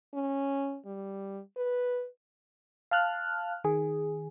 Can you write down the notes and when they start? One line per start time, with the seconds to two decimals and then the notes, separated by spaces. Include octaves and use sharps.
0.14 C#4
0.86 G3
1.57 B4
2.91 F5 A5 F6 F#6
3.64 D#3 G#4